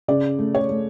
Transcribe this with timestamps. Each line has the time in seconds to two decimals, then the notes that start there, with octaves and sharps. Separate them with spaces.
0.08 C#3 D5
0.39 A3
0.55 C#5
0.70 A3